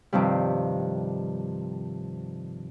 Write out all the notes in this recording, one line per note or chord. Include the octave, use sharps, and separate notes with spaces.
G2 C3 D#3 F3 G3